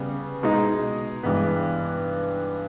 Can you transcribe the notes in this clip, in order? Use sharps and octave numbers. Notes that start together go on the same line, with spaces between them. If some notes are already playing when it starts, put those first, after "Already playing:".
Already playing: C#3 G3 B3
B2 G#3 D#4
G2 E3 G#3 B3